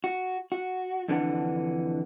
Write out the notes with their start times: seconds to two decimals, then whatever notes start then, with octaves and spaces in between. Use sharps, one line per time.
0.04 F#4
0.52 F#4
1.08 F2 D3 E3 D4 F#5